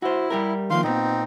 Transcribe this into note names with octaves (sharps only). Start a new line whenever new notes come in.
E4 F#4 C5
G3 G4 A#4
D#3 F3 A#3 F5 C6
A#2 B3 C4 D#4